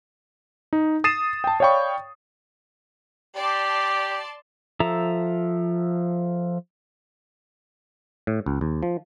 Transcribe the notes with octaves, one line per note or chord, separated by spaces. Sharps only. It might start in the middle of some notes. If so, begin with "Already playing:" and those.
D#4
D#6 A6 C7 D#7 E7
G5 A5
C#5 D5 F5 G5 B5 C#6
G4 D5 A5 C6
F3 A4 E5 A#5
A2
C#2
D#2
F3